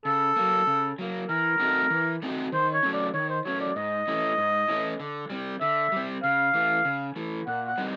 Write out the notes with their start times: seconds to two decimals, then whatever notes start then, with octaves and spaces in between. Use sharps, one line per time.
0.05 C#3 A4
0.36 F#3 A#3
0.67 C#3
0.99 F#3 A#3
1.29 E3 A#4
1.60 A3 C4 D#4 F#4
1.90 E3
2.22 A3 C4 D#4 F#4
2.52 D#3 C5
2.74 C#5
2.83 F#3 A3 C#4
2.93 D5
3.14 D#3 C#5
3.29 C5
3.45 F#3 A3 C#4 C#5
3.60 D5
3.76 G#2 D#5
4.08 E3 A3 C#4 E4
4.38 G#2
4.68 E3 A3 C#4 E4
5.00 D3
5.30 G3 C4
5.61 D3 E5
5.92 G3 C4
6.23 C#3 F5
6.54 E3 A3
6.85 C#3
7.16 E3 A3
7.47 A#2 F#5
7.67 F#5
7.78 G3 C4 D#4